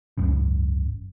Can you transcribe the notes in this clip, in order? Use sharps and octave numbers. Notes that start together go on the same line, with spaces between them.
G#1 C#2 F#2 C#3